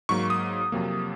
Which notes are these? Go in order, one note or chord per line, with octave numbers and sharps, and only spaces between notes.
G#2 F#3 A#3 C#6
D#6
F2 C3 F#3 A#3